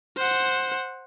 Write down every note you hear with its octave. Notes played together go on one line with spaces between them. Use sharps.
C5 F#5